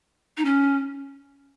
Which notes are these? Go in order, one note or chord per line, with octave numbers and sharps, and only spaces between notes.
D#4
C#4